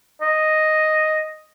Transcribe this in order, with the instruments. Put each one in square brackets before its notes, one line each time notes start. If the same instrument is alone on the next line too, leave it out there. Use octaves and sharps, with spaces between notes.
[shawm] D#5